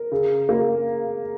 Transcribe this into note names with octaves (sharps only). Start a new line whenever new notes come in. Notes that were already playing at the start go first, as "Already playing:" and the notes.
Already playing: A#4
C#3
A#3